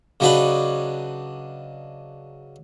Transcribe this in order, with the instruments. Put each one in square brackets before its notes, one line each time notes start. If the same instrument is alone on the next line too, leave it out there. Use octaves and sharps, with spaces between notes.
[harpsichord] C#3 F#3 D4 D#4 F#4 B4